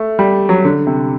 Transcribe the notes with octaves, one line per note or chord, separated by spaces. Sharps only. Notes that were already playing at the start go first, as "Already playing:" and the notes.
Already playing: A3
G3
F#3
D3
C3